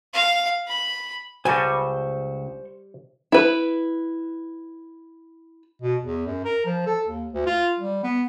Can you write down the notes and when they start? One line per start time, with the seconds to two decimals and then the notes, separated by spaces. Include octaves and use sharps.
0.14 F5
0.68 B5
1.45 C#2 G3 C5 D#5 G#5 A5 C#6
3.32 E4 B4
5.82 B2
6.04 E2
6.26 F#2
6.45 A#4
6.66 F3
6.87 A4
7.07 D#2
7.33 D2
7.46 F4
7.80 G3
8.04 B3